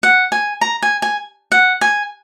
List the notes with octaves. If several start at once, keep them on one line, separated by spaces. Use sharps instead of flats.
F#5
G#5
A#5
G#5
G#5
F#5
G#5